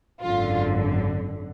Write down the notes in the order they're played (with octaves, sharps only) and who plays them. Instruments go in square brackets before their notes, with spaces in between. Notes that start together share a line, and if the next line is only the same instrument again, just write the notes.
[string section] G#1 F#2 D3 F4